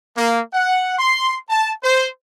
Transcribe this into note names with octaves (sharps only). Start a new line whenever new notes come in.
A#3
F#5
C6
A5
C5